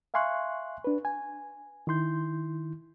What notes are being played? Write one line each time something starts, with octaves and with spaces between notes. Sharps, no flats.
E5 F5 G#5 C6 C#6 F#6
D4 B4
G#5
D#3 E4 C6 G6